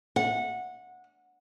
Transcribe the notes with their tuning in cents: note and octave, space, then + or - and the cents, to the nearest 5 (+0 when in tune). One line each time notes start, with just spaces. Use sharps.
F#5 -20